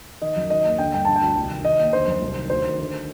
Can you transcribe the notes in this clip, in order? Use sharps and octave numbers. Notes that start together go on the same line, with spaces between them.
D#3 D#5
F#2
D#3 D#5
D#2
D3 G5
G2 G5
D3 A5
G5
D2
C2
D#3
D#3 D#5
D#2
D3 C5
F#2
C2
D#3
D2 C5
D#3
D3